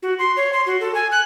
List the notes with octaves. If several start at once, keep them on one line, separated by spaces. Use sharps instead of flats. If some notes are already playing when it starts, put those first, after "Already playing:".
F#4
C6
C#5
C6
F#4
A4
G#5
F#6